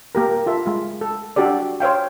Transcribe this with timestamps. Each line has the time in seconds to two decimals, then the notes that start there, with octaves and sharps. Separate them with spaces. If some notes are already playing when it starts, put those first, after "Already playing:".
0.15 A#3 G4 A#4
0.46 F4 A4 E5
0.66 G#3 F4
1.01 A4
1.36 D4 F#4 G4 A4 D5
1.80 C5 C#5 F5 G5